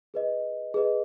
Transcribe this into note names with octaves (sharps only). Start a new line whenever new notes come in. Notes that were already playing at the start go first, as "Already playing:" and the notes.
G#4 B4 D#5
G#4 B4 D#5